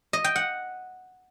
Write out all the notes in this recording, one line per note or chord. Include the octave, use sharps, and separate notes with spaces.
D#5
G5
F#5